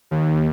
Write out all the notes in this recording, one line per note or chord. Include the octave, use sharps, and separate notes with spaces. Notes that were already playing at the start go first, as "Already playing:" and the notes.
D#2